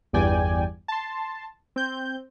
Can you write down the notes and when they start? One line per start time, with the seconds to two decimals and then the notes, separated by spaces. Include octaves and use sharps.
0.13 G1 E2 G2 D5 G5 G#5
0.88 A5 C6
1.76 C4 G6